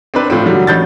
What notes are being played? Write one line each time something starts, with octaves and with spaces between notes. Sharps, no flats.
C4 D4 B4
A2 F3 C4
D3 F#3 G3
A1 G6 A6